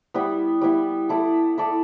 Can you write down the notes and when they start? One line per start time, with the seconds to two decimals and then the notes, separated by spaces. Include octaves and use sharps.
0.14 G3 B3 E4
0.61 G3 B3 E4
1.09 E4 A4 D5
1.58 E4 A4 D5